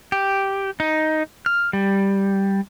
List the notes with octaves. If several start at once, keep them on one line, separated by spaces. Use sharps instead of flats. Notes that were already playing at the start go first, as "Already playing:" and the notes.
G4
D#4
F6
G3